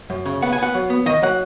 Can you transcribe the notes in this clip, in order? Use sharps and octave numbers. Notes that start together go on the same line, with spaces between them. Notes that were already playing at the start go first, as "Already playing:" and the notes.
F#2
C#3
B3 F#5
G#5
B3 F#5
F#3
B3
D#3 D#5
F#3 F#5